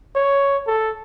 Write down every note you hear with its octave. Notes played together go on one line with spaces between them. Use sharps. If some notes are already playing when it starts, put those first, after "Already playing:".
C#5
A4